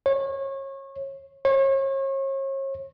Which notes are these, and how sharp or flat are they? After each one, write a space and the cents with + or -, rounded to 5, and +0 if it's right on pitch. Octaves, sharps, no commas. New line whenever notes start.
C#5 -30
C#5 -40